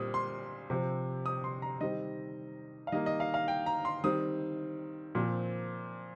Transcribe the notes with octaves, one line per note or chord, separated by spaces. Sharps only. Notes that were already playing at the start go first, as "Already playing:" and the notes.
Already playing: A#2 G3 C4 D#6
C6
C3 F3 C4
D#6
C6
A#5
D#3 G3 C4 D#5
F5
D#3 G3 A#3 D#5
D#5
F5
F5
G5
A#5
C6
D#3 G3 C4 D#6
A#2 F3 C4